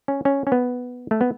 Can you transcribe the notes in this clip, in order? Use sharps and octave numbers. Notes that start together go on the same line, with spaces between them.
C#4
C#4
C#4
B3
A3
B3